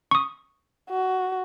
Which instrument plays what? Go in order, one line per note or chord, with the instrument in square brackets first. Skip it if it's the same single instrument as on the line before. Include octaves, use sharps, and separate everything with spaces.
[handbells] C#6 D#6
[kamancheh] F#4